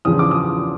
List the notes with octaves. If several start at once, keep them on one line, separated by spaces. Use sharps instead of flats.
E2 C#3 F3 D#6
D6
D#6